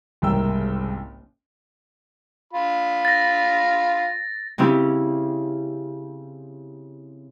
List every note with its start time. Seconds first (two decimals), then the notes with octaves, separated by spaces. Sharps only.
0.22 F#1 C2 G#2 A#4 G5 E6
2.53 F4 B5
3.05 A6 A#6
4.58 C#3 C4 C#4 E4 G4